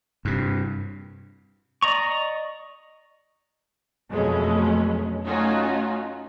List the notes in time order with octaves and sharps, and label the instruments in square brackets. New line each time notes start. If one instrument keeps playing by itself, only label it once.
[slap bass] G2 C3
[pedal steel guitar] D5 D#5 A#5 C#6
[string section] F2 B2 F#3 G#3 A3 C#4
A3 C#4 D#4 F4 F#4